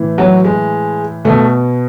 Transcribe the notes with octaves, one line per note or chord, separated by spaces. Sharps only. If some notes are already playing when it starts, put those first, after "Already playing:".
Already playing: A2 E3
F#3
G#3
B2 A3